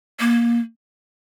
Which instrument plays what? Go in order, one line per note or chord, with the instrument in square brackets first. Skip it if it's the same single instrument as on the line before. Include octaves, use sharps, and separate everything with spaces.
[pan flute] A#3